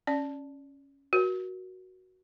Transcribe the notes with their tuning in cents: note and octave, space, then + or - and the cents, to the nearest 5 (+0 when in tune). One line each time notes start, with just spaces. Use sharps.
C#4 +0 D5 +0
F#4 +0 A#4 +40